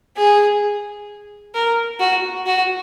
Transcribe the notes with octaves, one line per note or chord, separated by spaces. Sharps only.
G#4
A#4
F#4
F#4